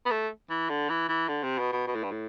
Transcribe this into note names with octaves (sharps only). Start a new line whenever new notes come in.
B3
A3
E3
D3
E3
E3
D3
C3
B2
B2
B2
A2
G2
A2